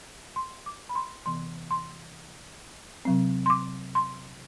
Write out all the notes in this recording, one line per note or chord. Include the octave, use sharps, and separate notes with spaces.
C6
D6
B5
C6
C3 E3 B3 C6
C6
C3 F#3 C4
C6
D6
C6